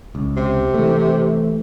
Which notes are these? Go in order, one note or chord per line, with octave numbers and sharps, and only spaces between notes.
C#2
C3
E3 A3